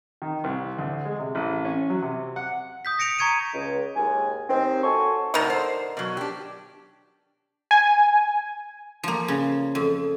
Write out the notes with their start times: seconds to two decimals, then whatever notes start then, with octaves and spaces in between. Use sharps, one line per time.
0.22 D#3
0.44 C2
0.78 D2
1.05 G#3
1.19 C3
1.35 A1
1.65 C#4
1.90 F#3
2.02 C3
2.36 F#5
2.85 D#6 G6 B6
2.99 A#6 C#7 D7 F7
3.19 A#5 C#6 G#6 C#7 D#7
3.54 C#2
3.96 D#2 G#2 G#5
4.50 D#2 D#3 C4
4.84 F#4 A4 C#5 G#5 C6 C#6
5.34 B2 D3 D#3 G#3 A3
5.50 C5
5.97 B2 F#3
6.17 D4 G4
7.71 G#5
9.03 F3 A#3
9.28 C#3
9.75 F2